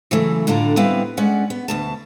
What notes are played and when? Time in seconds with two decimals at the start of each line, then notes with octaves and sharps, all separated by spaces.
0.11 C#3 E3 F#3 A3
0.47 A2 D3 D4 F4 A#5
0.77 G3 B3 C4 E4 B4 F5
1.17 G#3 C#4 D5 F#5
1.50 B3
1.68 D2 B2 A5